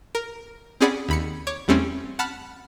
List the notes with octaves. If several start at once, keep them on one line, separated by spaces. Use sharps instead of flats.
A#4
C4 C#4 G#4 D5 F#5 B5
D#2 B5 C#7
C#5 C#6 D6
E2 G3 A3 C4 C#4
F#5 A5 B5 F6 F#6